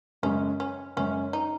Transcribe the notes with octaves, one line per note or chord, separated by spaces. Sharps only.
F#2 C#3 G#3 C#4
C#4
F#2 C#3 G#3 C#4
D#4